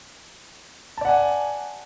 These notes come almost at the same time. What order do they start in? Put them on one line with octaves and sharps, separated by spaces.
A5 D5 F#5 G#5